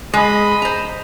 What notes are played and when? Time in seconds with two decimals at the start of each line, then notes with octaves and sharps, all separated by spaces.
0.14 G#3 D#5 B5
0.62 C5 A#5